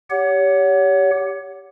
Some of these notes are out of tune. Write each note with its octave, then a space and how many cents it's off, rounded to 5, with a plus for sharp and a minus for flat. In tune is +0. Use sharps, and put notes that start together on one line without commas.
G4 +0 C#5 +30 F#5 +0